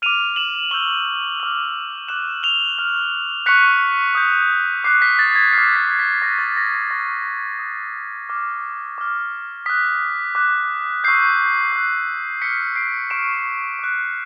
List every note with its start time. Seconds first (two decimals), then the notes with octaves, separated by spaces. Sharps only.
0.02 D6 F6 D#7 F7
0.36 E7 F#7
0.71 C#6 E6 G6 F7 G7
1.40 D6 F6
2.08 D6 F#6 E7 F#7
2.43 F7 G7
2.78 C#6 F6
3.46 C#6 F#6 B6 C#7
4.15 D#6 G6
4.84 D6 F#6 C7
5.02 B6
5.19 A6
5.35 G#6
5.53 D6 F6 C7
5.76 B6
5.99 B6
6.22 C#6 F#6 A#6
6.39 A6
6.57 A#6
6.74 A#6
6.90 C#6 F6 A#6
7.59 D#6 F#6
8.29 D6 F6
8.98 D6 F6
9.66 D#6 F#6 B6
10.35 D6 F#6
11.04 C#6 E6 G6 C7
11.72 D6 F#6
12.42 D6 F6 B6 C#7
12.76 C7 D7
13.10 C#6 F6 D7 E7
13.79 D6 F#6